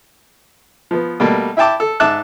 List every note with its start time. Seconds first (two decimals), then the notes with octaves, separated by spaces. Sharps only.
0.91 F3 B3
1.20 B2 G3 A3 A#3
1.57 E4 E5 G5 A5 D6
1.80 A4
2.00 G#2 E5 A5 D6 F#6